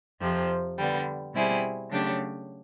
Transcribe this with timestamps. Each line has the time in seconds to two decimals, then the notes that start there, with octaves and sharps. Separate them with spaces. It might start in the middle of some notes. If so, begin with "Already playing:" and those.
0.20 F2 C3 F3
0.77 D3 G3 B3
1.33 B2 G3 C4 E4 G#4
1.89 C#3 F#3 A3 D4 G4